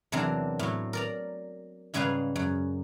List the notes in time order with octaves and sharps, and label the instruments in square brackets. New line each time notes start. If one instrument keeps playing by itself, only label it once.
[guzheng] E2 C3 F#3 C4 D4 A#4
A2 F#3
A#4 D5 A#5
G#2 C#3 G3 G#4 B4 F5
F#2